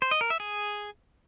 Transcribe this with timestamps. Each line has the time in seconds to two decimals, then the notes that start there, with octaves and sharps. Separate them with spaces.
0.02 C5
0.11 D#5
0.21 A#4
0.30 E5
0.40 G#4